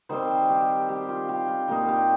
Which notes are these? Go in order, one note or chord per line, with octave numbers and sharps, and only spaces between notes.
D#3 G3 C4 C5
G4
G4
F4
G4
F4
A#2 G3 A#3 D#4 F4
G4